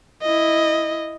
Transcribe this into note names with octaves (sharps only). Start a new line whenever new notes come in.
E4 D#5